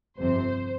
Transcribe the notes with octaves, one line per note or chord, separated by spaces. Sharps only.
G1 F2 C3 C5